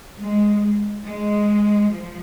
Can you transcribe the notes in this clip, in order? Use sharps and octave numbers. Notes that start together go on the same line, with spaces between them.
G#3
G#3
F3